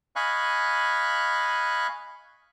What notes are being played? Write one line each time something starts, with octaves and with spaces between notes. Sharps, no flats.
D#5 F5 G#5 B5 C#6 F#6